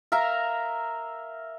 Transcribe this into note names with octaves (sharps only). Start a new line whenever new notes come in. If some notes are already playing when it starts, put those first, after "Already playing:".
A#4 E5 F5 A#5